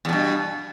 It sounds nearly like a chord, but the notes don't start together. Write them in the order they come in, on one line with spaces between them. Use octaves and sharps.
E2 B2 G2